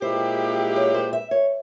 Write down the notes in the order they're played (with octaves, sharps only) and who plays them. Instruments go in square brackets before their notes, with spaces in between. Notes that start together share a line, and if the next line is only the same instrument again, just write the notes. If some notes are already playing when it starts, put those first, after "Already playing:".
[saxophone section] A#2 G#3 E4 G4 [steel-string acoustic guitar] C5
[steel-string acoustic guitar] C#5
C5
E5
C#5